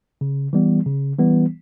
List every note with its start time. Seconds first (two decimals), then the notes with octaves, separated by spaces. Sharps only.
0.21 C#3
0.53 E3 G3 B3
0.86 C#3
1.19 E3 G3 B3